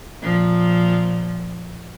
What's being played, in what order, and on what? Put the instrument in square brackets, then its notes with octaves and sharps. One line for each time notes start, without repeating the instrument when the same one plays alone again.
[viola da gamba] A#2 F3